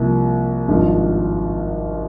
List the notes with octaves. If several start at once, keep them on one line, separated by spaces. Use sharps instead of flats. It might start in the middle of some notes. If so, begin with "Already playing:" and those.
Already playing: C2 C3 F3 A#3
G#1 G2 F3